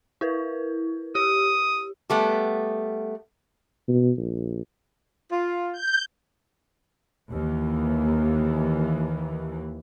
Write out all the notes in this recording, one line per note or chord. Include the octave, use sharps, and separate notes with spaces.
E4 A#4 B4
G4 D#6
G3 A3 B3
B2
A#1
F4
G6
D#2 E3